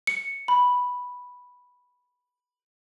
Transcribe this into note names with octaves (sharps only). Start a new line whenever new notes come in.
C#7
B5